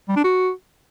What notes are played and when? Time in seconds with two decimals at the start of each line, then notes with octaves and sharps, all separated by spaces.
0.08 G3
0.16 D4
0.24 F#4